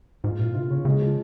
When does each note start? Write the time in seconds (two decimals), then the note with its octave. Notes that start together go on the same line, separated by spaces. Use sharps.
0.24 G#2 F4
0.39 A#2 F4
0.54 C3 F4
0.70 C#3 C#4
0.85 C#3 G#3
1.01 F3